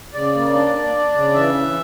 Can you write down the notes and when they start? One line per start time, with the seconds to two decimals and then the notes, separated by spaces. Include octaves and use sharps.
0.14 C#3 D5
0.35 A#3
0.54 D4
0.74 D4
0.94 D4
1.14 C#3
1.34 E3 E5
1.54 E3